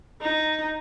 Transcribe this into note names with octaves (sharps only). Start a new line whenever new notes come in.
D#4